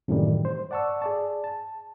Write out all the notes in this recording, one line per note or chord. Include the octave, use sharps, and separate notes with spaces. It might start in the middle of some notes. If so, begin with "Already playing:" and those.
F#2 A2 C3 D#3 E3 G3
C5
D5 F#5 A5 C#6 E6
G#4 D5 A5
A5